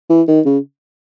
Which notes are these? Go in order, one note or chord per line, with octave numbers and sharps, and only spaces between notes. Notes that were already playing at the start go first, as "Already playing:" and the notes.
E3
D#3
C#3